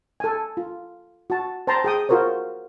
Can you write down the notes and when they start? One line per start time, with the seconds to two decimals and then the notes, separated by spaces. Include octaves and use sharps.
0.20 A4 G#5
0.57 F4
1.30 F#4 A5
1.67 C5 G5 A5 A#5 C6
1.84 G#4 G5 D#6
2.09 F4 F#4 A#4 C5 C#5